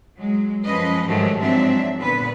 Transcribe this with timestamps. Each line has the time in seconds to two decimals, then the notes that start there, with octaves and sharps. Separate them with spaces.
0.17 F#3 G#3
0.64 F#2 F3 G#3 C#4 B4 D#5
1.06 G#2 D#3 F3 F#3 A3 G4
1.38 G#2 F3 F#3 C4 D4 E5
1.98 A#2 D3 B3 B4